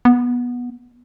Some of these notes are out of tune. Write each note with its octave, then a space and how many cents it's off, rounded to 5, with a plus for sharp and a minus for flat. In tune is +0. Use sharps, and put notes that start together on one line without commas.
B3 -15